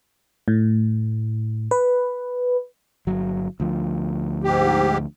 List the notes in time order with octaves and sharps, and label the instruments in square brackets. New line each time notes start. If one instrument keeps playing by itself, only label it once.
[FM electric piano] A2
B4
[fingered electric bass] G1 F#3
D2 F3
[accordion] G#2 G4